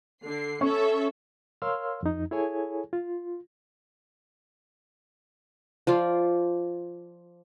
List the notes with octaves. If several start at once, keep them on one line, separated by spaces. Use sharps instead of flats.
D3 C7
C#4 A4 E5 C#6
A#4 C#5 F5 C6 E6 F6
F2 D#4
E4 G#4 A4 C#5 G#5
F4
F3 F4 D5